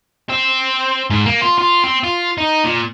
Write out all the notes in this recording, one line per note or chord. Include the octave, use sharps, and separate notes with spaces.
C4
G#2
A#3
F4
F4
C4
F4
D#4
A#2